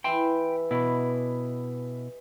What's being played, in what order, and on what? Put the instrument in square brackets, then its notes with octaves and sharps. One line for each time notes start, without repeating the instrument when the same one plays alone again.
[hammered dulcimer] E3 G4 E5 [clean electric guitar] G5 C6
[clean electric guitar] B2 E4 [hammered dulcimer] B4 D#5 D6